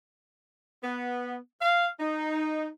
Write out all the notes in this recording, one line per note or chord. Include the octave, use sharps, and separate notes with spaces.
B3
F5
D#4